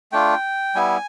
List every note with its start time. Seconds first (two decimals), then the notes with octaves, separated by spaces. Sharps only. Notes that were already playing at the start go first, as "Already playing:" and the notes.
0.12 A3 D4 F4 G5
0.75 G3 B3 E4 G#5